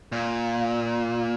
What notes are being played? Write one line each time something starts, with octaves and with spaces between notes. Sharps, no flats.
A#2